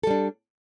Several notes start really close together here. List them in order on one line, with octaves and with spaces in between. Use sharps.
A4 G3 D4